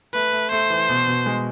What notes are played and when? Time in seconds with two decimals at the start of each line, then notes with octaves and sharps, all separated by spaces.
0.14 A3 B4
0.33 A3
0.51 A3 C5
0.70 E3
0.89 B2
1.07 B2
1.26 G#3